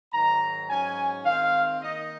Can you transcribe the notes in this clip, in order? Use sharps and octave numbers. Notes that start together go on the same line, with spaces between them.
G#2 D#3 F#3 A#5
G#2 F#3 C#4 G#5
D#3 G#3 C4 F5
D#3 A#3 D#4 D#5